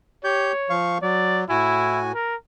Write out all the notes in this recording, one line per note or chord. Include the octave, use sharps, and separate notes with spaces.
G4 C#5 G6
F3 F5 C#6
F#3 D5
A2 E4 F#4 G#5
A#4